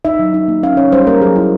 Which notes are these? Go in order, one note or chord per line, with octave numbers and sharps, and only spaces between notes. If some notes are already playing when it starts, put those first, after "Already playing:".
D#4 E5
F#3
D#4
A#3
C#4 F5
C#4 C#5
G3 C5
A#3 A#4
F#3 G#4
E4